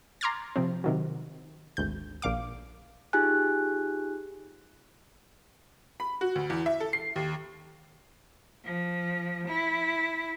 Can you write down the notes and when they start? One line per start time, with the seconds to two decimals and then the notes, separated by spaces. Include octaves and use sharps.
0.21 A#5 C6 D6 F6 G#6 A6
0.56 C3 F3 C4
0.84 C3 D#3 F#3
1.77 G#1 D2 G6
2.22 A#1 A#2 F5 D6
3.13 D#4 F4 G4 G#4 G#5 F#6
6.00 B5
6.21 F#4
6.35 D2
6.50 E2
6.66 E5
6.80 A4
6.93 C7
7.16 D#2
8.64 F3
9.47 E4